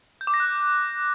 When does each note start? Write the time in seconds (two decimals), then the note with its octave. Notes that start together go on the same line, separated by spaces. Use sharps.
0.21 G6
0.27 D6
0.34 A#6
0.40 F#6